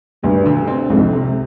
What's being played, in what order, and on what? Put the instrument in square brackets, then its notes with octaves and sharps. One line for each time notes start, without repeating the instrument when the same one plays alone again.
[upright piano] D2 [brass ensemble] G2
[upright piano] D3
C4
[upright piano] C2 [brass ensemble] F2 G#2
[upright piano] C3